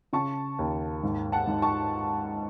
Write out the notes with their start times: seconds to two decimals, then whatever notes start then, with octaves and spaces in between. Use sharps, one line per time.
0.13 C#3 A5 C#6
0.59 D#2
1.03 G#2
1.32 F#5 A5
1.47 G#2
1.62 A5 C#6